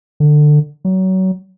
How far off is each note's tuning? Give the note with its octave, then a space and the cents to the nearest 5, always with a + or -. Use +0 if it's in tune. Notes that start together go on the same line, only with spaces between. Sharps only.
D3 +20
F#3 +25